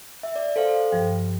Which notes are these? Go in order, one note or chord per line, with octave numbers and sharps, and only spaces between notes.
E5
D5
A4 C5 F5
G2 F3 G5